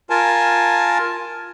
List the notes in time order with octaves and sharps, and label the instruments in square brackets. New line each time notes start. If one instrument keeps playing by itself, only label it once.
[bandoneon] F4 A#4 G#5 A5